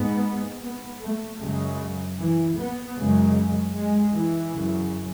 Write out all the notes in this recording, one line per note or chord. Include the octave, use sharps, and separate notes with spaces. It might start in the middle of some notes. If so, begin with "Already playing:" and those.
Already playing: G#2 B3
B3
A3
F#2 C#3 G#3
E3
B3
F#2 C#3 G#3
G#3
E3
F#2 C#3